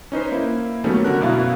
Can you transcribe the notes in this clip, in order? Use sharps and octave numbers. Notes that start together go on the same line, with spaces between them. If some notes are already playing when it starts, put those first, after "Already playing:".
C#4 D#4 B4 C5
A#3 E4
D#3 F#3 G3 A3 B3 C#4
D3 F#4 A#4 F#6
F#2 B2 E4 F5